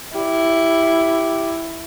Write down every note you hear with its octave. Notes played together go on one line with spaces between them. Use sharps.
E4 G4